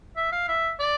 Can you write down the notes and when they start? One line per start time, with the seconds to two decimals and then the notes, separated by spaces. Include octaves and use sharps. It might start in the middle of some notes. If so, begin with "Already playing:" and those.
0.16 E5
0.32 F5
0.48 E5
0.79 D5